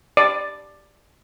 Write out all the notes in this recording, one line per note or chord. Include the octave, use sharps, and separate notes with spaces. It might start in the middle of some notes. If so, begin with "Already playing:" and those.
D5